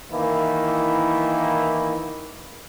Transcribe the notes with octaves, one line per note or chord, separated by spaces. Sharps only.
D#3 E3 A#3 E4